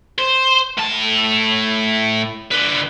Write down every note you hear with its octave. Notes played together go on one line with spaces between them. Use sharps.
C5
A2 A5
D3 B4